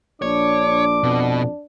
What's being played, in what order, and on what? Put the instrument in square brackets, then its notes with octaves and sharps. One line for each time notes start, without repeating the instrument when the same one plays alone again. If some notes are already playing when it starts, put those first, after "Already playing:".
[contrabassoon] A#1 [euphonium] D4 [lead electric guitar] C#5 [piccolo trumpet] D6
[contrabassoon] F2 [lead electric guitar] B2